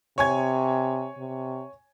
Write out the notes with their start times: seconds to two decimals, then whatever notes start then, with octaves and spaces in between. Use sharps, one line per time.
0.18 C3 C#5 G#5 G#6
1.18 C3